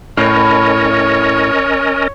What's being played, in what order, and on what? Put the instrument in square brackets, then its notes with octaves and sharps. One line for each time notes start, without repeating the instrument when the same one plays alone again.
[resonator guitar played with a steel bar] A2 [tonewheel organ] C#4 A#4 D#5 [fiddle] C#5